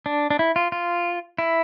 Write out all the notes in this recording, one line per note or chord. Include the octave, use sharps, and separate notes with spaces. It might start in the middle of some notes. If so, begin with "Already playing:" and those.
D4
D4
E4
F4
F4
E4